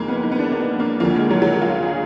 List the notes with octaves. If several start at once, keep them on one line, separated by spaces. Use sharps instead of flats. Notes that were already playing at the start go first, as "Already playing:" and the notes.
Already playing: F#1 F2 D#3 G#3 A#3
B3
D#4
B3
D4
A#3
B3
A#3
D2 D3 F3 A#3
G#3
F#3
F#3
G#3
F4
G#4